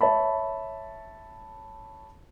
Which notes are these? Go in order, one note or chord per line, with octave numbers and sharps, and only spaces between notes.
C#5 E5 A5 B5